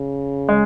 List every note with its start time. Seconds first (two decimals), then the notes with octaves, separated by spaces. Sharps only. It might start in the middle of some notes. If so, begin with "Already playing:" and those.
Already playing: C#3
0.49 G#3